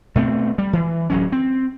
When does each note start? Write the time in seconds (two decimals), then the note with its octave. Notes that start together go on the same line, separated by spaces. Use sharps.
0.15 B2 A3 C4
0.58 G3
0.73 E3
1.10 D1 F#3 C#4
1.32 C4